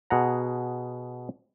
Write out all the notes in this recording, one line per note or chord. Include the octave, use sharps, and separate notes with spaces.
B2 G#4 F#5 A#5